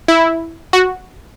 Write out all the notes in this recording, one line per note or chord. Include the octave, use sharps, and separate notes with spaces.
E4
F#4